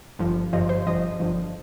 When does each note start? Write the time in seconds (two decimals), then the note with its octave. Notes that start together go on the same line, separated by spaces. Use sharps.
0.19 G1 G2 F3
0.53 G1 G2 F3 D#5
0.69 C5
0.86 G1 G2 F3 D#5
1.20 G1 G2 F3